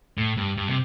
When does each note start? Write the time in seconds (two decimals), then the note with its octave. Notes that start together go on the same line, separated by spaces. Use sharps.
0.18 A2
0.37 G2
0.57 G2
0.68 C3